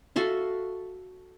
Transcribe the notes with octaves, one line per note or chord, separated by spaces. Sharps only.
F#4 A4 E5 F5